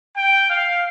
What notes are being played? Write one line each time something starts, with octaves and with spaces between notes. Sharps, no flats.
G5
F5